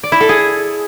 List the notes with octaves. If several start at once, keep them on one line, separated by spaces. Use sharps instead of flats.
D5
E4
A4
G#4